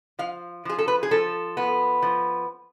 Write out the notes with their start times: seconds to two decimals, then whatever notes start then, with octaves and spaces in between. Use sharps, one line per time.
0.19 F3 F5
0.65 F3 G#4
0.78 A4
0.88 B4
1.03 G#4
1.11 F3 A4
1.57 B3
2.02 F3